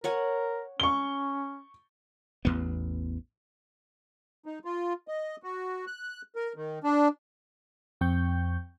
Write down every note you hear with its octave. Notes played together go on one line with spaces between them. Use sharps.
A#4 C#5 F#5 G#5
C#4 C#6 G7
A1 E2 B3
D#4
F4
D#5
F#4
F#6
A#4
D#3
D4
F2 C4 G5 C#6 G6